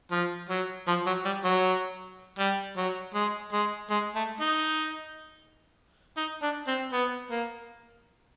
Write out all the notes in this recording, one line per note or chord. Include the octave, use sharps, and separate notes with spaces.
F3
F#3
F3
F#3
G3
F#3
G3
F#3
G#3
G#3
G#3
A3
D#4
D#4
D4
C4
B3
A#3